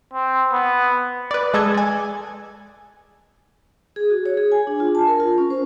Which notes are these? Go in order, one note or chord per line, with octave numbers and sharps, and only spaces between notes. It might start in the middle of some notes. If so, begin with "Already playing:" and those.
C4
B3
B4 D5
G#3 A4 D#5 G#6
D5 G#5
G#4
F#4
C#5
G#4
G#5
D4
F4
A5
A#4
F4
C#4
C5